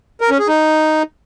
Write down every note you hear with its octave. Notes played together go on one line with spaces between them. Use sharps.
A#4
C#4
G#4
D#4